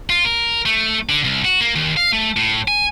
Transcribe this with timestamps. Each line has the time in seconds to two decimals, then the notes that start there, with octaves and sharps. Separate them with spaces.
0.10 F4
0.25 A#4
0.66 A3
1.09 D3
1.24 C2
1.45 F#4
1.61 A#3
1.75 D#2
1.97 F5
2.13 A3
2.37 A2
2.68 G#5